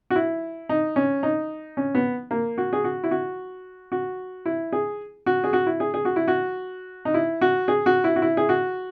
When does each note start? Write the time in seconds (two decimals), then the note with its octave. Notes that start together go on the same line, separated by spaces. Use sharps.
0.10 F#4
0.16 E4
0.69 D#4
0.96 C#4
1.23 D#4
1.77 C#4
1.95 B3
2.31 A#3
2.58 F#4
2.73 G#4
2.84 F#4
3.04 E4
3.11 F#4
3.92 F#4
4.46 E4
4.72 G#4
5.26 F#4
5.44 G#4
5.53 F#4
5.67 E4
5.80 G#4
5.94 G#4
6.05 F#4
6.16 E4
6.28 F#4
7.05 D#4
7.14 E4
7.41 F#4
7.68 G#4
7.86 F#4
8.04 E4
8.16 F#4
8.22 E4
8.37 G#4
8.49 F#4